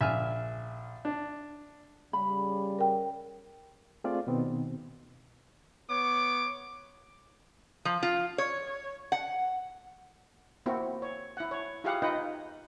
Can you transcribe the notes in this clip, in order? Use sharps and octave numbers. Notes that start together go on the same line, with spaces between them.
A#1 E5 G#5 F6
D4
C#3 G3 B5
A#4 G5
A3 C4 F4 G#4 D5
B2 D#3 B3 C4
B3 C#5 D6
F3
F4
C#5
F#5
A#3 C4 E4 F#4
C#5
E4 F#5
C#5
E4 F4 G4 G#4 F5 F#5
D#4 F4 B4 D#5 F#5 G5